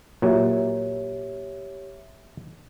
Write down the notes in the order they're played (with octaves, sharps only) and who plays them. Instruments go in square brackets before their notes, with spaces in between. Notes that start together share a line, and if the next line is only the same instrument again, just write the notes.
[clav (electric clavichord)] A#2 F#3 [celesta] G4 C#5 E5